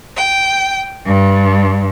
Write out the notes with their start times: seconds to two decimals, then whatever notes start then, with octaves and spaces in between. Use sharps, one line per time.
0.15 G5
1.05 G2